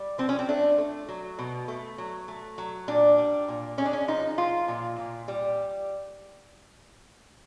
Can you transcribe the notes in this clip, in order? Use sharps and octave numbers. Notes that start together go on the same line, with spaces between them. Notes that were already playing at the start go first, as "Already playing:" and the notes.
Already playing: G3
F3 C4
C#4
C4
A3 D4
A3
F#3
B2
A3
F#3
A3
F#3
A#2 D4
G3
A#2
G#3 C#4
D4
C#4
F3 D#4
F3 F4
A#2
A#2
G3